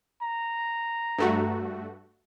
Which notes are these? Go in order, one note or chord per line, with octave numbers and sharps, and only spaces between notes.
A#5
G2 A3 F#4